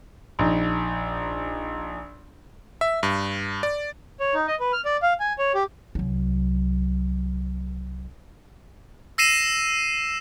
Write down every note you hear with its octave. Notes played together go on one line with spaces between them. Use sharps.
A#1 D#4
E5
G2
D5
C#5
D#4
D#5
B4
F6
D5
F5
G#5
C#5
G4
C2 F#3
E6 A#6 C7 D#7 E7